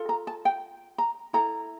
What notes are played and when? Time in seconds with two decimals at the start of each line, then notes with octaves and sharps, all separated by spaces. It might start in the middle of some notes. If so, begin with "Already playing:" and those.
Already playing: F4 A4
0.09 A#5
0.27 A5
0.45 G5
0.98 A#5
1.33 E4 A4 A#5